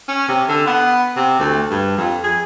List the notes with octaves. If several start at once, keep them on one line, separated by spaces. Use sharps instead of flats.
C#4
C3
D3
B3
C3
D2
G2
F2
G#4